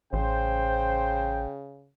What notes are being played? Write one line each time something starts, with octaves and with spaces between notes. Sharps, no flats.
A1 C#3 C5 G5